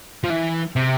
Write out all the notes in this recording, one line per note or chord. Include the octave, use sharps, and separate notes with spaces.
F3
E3
C3